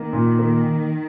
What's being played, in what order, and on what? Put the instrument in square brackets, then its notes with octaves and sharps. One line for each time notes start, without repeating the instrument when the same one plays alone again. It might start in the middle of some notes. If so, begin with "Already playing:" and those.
Already playing: [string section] D#3 [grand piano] A#3
[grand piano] A#2
A#3